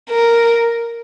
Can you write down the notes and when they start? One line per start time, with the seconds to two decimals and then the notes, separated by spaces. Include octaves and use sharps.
0.10 A#4